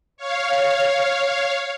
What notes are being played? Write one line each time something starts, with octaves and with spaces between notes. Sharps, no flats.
C#5 F5